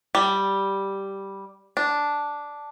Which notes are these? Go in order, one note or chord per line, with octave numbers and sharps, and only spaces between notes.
G3
D4